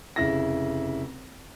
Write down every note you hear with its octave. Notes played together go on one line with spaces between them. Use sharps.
F1 C#3 E4 A#6